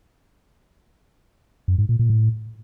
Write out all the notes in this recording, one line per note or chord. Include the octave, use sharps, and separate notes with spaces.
F#2
G#2
A#2
A#2
A2